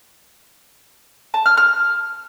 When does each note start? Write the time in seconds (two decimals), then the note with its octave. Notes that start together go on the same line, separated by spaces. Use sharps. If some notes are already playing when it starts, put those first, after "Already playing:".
1.34 A5
1.46 F6
1.57 F6